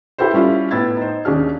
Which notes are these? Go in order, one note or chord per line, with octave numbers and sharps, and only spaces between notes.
E4 G4 A4 B4 C5
G3 C#4 E4 F4
A2 B3 B5 E6 G#6 A6
D#4 C5
D#2 C#4 D4 G#4 F6